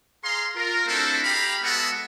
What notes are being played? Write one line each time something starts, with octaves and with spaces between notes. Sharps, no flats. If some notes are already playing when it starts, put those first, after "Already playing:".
G#4 F5 A#5 C6
F4 A#4
A3 C4 D4 E4 F#4 A4
G4 F5 G5 A#5 B5
G#3 B3 F#4 A4 E5 F#5